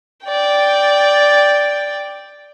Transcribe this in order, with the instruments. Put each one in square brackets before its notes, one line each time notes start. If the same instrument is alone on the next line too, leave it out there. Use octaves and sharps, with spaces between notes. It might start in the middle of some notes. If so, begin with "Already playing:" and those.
[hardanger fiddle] D5 G5